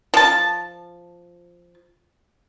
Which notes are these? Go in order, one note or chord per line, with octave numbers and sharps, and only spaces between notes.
F3 A5